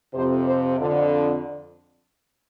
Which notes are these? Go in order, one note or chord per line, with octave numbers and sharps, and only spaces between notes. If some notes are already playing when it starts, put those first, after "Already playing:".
F2 C3 C5
C5
F2 D3